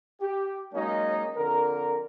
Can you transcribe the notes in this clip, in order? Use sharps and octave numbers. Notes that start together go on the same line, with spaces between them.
G4
F#3 G#3 A#3 C#4 D#4
F2 D3 A#4